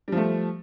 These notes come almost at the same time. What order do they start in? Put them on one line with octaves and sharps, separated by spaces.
G3 F3 A3